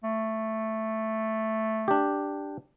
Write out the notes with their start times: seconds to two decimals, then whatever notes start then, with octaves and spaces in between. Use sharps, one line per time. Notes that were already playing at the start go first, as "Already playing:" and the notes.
0.04 A3
1.88 D4 G4